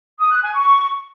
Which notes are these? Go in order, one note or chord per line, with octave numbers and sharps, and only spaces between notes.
D#6
F#6
G#5
C#6